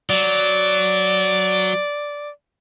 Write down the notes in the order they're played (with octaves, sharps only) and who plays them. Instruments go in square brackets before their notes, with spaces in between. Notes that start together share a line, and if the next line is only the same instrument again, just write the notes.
[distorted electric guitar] F#3 [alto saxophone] D5